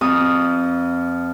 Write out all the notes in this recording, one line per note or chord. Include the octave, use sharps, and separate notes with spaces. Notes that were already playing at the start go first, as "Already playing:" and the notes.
F2 D#6